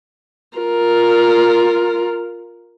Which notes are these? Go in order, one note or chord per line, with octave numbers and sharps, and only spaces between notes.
F4 A#4